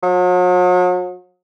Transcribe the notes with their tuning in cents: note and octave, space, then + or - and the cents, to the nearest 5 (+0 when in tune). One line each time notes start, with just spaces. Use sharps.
F#3 -40